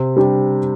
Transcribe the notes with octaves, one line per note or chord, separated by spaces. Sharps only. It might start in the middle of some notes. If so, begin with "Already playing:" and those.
Already playing: C3
G3 D4 G4